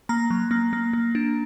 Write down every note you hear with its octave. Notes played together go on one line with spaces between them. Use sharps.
A#3 A#5
F#3
A#3
A#3
A#3
D4